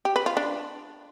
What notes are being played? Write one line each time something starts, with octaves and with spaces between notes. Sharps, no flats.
G4
B4
F4
D4